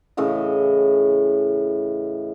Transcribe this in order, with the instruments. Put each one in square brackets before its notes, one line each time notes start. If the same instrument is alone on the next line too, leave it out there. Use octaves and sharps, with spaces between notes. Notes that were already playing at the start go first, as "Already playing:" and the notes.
[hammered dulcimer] A2 C#3 E3 D#5